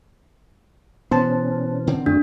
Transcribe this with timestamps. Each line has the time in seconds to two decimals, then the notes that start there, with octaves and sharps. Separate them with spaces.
1.11 B2 E3 B3 C#4 C5 A5
1.87 D3 D#3 C4
2.06 F#2 A3 D4 F#4